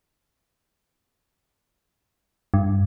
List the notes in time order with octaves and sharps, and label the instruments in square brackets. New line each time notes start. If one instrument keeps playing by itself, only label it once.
[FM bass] G2